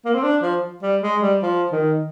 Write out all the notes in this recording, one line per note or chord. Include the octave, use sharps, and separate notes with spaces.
A#3
C4
D4
F3
G3
G#3
G3
F3
D#3